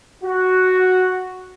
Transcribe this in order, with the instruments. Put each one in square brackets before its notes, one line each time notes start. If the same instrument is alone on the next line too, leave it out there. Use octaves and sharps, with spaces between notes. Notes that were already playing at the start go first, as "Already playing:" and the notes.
[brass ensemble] F#4